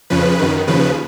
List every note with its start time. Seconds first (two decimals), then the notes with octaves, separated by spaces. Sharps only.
0.10 F2 C#3 F3 B4
0.39 F#2 D#3
0.67 D#2 C#3 F3 B4